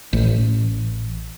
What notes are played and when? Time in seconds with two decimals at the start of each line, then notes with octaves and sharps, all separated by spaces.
0.13 A1